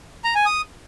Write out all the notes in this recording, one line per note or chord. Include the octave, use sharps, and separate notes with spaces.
A#5
G#5
D#6